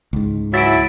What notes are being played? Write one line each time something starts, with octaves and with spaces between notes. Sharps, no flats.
C#2 G#2
E3 F#3 E4 A6 B6 D7